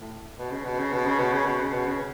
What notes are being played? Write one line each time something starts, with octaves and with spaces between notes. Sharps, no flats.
A2
B2
C#3
B2
C#3
B2
C#3
B2
C#3
B2
C#3
B2
C#3